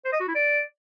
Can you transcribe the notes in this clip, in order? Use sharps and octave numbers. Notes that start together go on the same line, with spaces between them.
C5
D#5
F#4
E4
D5